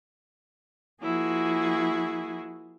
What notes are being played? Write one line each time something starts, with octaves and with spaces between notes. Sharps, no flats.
F3 A#3 E4 F#4 G#4